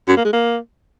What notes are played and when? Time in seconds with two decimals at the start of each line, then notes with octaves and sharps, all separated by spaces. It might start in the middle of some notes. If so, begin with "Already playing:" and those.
0.08 F#2
0.16 A#3
0.25 G#3
0.33 A#3